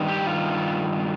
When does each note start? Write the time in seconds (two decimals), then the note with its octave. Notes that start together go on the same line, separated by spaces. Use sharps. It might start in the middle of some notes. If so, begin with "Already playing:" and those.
Already playing: G2 D#3
0.08 G4
0.27 F4